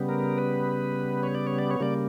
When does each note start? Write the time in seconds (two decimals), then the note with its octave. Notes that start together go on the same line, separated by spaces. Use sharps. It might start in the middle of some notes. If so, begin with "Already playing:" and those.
Already playing: C#3 G3 B3
0.09 A#4
0.38 B4
1.23 C#5
1.35 D5
1.47 C#5
1.58 D5
1.71 C#5
1.80 C#3 G3 A#3 D5